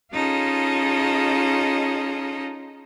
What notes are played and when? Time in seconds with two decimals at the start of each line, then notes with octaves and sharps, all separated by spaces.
0.13 C#4 D#4 F4 G#4 A4 D#5